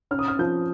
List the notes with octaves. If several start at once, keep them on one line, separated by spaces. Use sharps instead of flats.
C#4 F6
D#6
F6
F3 G6